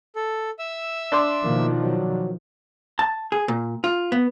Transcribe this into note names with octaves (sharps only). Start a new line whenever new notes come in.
A4
E5 E6
D4 C6 D6
B2 D#3 F3 A#3
F#3
A5
G#4
A#2
F4
B3